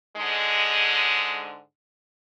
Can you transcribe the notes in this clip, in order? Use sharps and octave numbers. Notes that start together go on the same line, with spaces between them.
G#2 D3 G#3